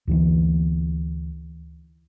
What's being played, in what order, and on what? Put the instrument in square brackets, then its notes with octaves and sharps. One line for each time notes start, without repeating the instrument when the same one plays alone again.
[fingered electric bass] D2 D3 E3